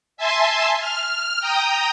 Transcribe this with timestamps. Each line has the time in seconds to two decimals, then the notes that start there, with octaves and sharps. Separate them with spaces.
0.17 E5 G#5 A5 C6
0.80 F6
1.40 G5 A#5 D#6